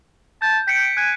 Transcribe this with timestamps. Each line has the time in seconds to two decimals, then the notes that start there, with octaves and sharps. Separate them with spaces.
0.42 A5 G6
0.68 G5 B6 C#7 D7
0.97 G#5 F#6